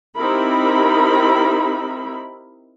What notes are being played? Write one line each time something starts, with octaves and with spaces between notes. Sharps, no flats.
C4 D#4 E4 G4 A#4 B5